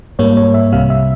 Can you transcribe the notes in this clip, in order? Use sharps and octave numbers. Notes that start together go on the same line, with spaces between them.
G#2 G3 A#3 C#5
C#5
E5
C2 C3 G3 F5
E5